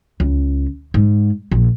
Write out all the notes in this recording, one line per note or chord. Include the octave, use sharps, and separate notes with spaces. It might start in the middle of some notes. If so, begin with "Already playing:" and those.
C#2
G#2
A#1